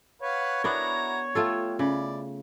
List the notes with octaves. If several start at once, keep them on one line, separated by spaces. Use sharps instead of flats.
B4 C#5 F5 F#5
B3 D4 E4 F#4 A#4 A#5
A3 F4 G4 A4
C#3 E4 D5